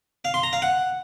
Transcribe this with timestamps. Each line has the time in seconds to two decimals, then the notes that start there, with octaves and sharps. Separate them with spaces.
0.25 F5
0.34 C6
0.43 A#5
0.53 F5
0.62 F#5